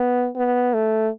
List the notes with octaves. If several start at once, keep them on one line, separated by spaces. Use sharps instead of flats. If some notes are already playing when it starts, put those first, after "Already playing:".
Already playing: B3
B3
A3